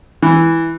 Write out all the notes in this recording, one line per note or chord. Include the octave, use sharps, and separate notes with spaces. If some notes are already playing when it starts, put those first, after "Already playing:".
E3